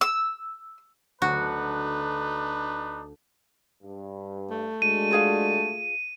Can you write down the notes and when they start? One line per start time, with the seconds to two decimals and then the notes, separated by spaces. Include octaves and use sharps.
0.01 E6
1.22 D2 A3 D4 D#4 F#4 B4
3.83 G2
4.50 A3
4.82 G#3 D4 F#4 D#7
5.11 F4 G#4 F5